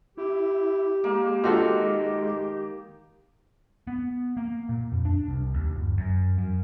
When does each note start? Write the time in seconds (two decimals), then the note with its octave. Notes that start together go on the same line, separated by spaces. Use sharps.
0.18 E4 G4
1.04 G#3 A#3
1.44 D#3 F4 F#4 A4
3.87 B3
4.37 A#3
4.69 A#2
4.92 F2
5.05 D4
5.28 C2
5.54 D#2
5.76 G1
5.98 F#2
6.38 F#2